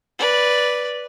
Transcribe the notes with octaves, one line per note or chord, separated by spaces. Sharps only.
B4 D5